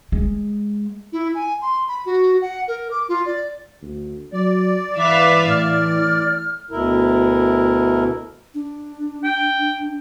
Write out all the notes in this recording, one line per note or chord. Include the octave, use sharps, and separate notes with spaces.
G#3
E4
G#5
C6
B5
F#4
F#5
A#4
D6
F4
D5
D2
F#3 D5
E3 B4 E5 F5 D6
A2 F6
D2 B2 E4 A#4
D4
G5